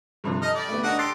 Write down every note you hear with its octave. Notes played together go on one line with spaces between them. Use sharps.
G2 C3 F3
D#4 A4 D#5 F6
G3 D5
A3 B3
D4 D#4 F#4 F#5
G4 A4 C6 A6 C7